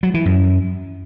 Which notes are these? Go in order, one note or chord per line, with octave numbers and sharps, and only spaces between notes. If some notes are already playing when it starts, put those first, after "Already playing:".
F#3
E3
F#2